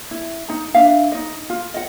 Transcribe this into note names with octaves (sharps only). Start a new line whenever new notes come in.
E4
D#4 A#5
D4 E5 F5
D#4 D#5
F4
D#5 F#5